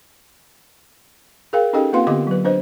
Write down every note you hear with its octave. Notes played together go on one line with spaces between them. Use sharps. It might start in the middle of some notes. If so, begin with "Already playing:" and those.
G#4 A#4 F5 G5
C#4 D#4 G4 A4 D#5 G5
A#3 C4 F4 B4 F5 C6
D3 B3 G4 D#5 D6
F#3 B4
D4 B4 C5 D#5